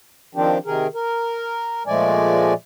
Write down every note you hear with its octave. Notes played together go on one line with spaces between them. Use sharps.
D#3 F3 C4 D4 G4
C3 D#3 G#4 A#4
A#4
A#2 F3 G#3 A3 D5 G#5